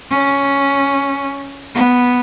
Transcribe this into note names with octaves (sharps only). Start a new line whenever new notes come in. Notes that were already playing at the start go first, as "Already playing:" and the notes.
C#4
B3